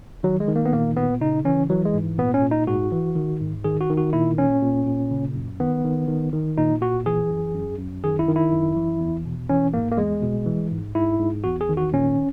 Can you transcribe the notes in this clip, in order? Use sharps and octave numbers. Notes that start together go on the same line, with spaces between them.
D#3 F#3
G#3
D#3
A#3
B3
A#2 A#3
A#2 B3
C#3 D#4
E3 C#4
E3 F#3
G#3
G#2
A#2 B3
C#4
A#2
D#4
G#2 F#4
E3
D#3
G#2
D#3 G#4
F#4
D#3
F#4
A#2 E4
A#2 C#4
A#2
A#2
C#3
F#2
D#3 B3
D#3
D#3
D#3
A#2 D#4
A#2 F#4
E3 G#4
F#2
F#2
F#2
D#3 G#4
E4
D#3
E4
F#2
E3
E2
B2
E3 C#4
G#2 A#3
A#3
E2 G#3
B2
E3
G#2
G#2 E4
G#2
E2 F#4
G#4
D#3
F#4
A#2 C#4